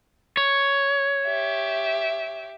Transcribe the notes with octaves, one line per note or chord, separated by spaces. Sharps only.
C#5
G4 E5